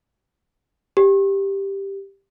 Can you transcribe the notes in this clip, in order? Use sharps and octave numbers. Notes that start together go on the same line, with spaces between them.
G4